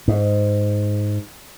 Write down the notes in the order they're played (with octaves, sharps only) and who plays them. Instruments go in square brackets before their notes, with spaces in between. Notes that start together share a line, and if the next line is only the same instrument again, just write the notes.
[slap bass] G#2